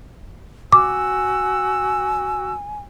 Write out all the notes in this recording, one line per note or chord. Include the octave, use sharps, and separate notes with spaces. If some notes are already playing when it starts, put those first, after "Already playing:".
F#4 G#5 D6 E6